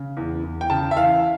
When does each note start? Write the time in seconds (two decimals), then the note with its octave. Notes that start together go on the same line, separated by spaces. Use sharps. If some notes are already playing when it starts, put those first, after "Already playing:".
Already playing: C#3
0.17 E2
0.43 E2
0.61 G5
0.70 C#3 A5
0.91 E5
0.97 E3 F5